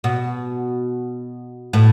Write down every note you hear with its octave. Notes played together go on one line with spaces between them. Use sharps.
B2
A2